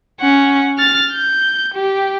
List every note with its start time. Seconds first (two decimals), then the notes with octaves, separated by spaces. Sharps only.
0.20 C#4 F#5
0.78 F6 A6
1.12 G6
1.74 G4